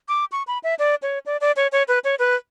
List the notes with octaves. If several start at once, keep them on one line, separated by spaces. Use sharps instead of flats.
D6
C#6
B5
E5
D5
C#5
D5
D5
C#5
C#5
B4
C#5
B4